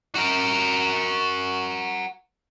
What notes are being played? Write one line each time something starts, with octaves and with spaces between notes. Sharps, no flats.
F#4 A#4